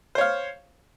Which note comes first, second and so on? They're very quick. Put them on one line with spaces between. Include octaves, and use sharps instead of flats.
C5 C#5 F5